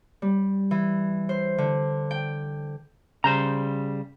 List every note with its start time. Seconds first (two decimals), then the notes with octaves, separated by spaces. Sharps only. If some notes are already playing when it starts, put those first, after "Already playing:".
0.22 G3
0.71 E3
1.29 C5
1.58 D3
2.11 G5
3.24 C#3 G3 C5 A#5 G6